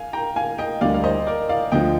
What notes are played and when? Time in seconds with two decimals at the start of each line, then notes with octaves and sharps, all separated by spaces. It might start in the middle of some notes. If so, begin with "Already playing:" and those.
Already playing: F5 G#5
0.13 G5 A#5
0.36 F5 G#5
0.58 D#5 G5
0.81 D2 D3 G3 A#3 D4 D5 F5
0.94 F5
1.04 C5 D#5
1.27 A#4 D5
1.49 D5 F5
1.72 D2 D3 F3 D#5 G5